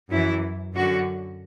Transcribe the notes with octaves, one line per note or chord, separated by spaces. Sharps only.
F#2 E3 E4
F#2 D3 F#4